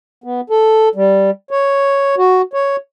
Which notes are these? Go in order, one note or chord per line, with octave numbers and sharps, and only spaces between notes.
B3
A4
G3
C#5
F#4
C#5